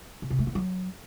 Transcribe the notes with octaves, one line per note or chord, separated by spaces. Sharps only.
C#3
C3
A3
B3
F#3